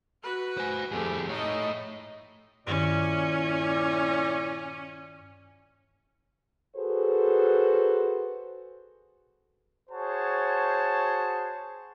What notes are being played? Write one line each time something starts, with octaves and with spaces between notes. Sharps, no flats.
F#4 B4
C5 G#5
F2 A3 G4 G#4
A3 D#4 C#5 D#5
G2 A#2 D#3 C#4 E4 D5
F#4 G#4 A4 B4 C5
F#4 G#4 C5 C#5 A5